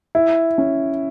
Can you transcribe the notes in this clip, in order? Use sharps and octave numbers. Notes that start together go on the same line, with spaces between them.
E4
C#4